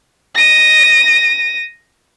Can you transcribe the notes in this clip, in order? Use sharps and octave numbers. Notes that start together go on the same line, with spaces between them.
A#6 D#7